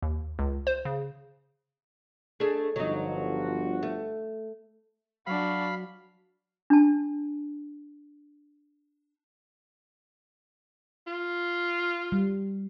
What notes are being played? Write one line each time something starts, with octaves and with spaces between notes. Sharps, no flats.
D#2
C#2
C5
C#3
A3 D4 G#4
G1 F3 F#3 D#4 F#4
A3
F#3 D4 F#4 F5 B5
D4 A5
F4
G3